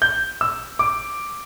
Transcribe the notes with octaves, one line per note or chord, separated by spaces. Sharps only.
G6
E6
D6